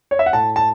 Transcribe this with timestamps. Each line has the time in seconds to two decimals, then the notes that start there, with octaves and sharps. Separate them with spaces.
0.11 C#5
0.19 E5
0.26 F#5
0.33 A2 A5
0.56 A5